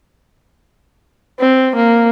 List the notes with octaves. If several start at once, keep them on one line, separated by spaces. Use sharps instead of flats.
C4
A#3